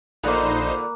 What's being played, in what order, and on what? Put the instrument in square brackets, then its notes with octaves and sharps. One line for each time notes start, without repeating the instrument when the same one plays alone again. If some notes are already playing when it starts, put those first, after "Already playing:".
[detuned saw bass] A#1 [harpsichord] A#2 D3 [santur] A#3 B4 [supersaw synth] D#4 C5